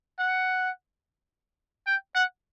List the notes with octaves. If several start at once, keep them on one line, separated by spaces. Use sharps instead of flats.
F#5
G5
F#5